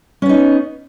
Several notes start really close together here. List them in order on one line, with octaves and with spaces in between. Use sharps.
C#4 B3 D#4